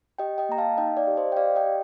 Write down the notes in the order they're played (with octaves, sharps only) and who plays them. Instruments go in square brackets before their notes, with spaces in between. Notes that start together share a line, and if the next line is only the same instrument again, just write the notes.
[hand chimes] G4 D#5 G5
D#5 G5
A#3 A#5
F5 A5
D#4 D#5 G5
D5 F5
G4
C5 D#5
G5
G4 D5 F5
D#5 G5
G4